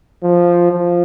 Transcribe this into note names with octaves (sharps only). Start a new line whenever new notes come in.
F3
F3